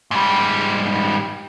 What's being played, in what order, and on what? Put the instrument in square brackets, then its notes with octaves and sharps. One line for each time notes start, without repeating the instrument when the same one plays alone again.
[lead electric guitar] G#2 G3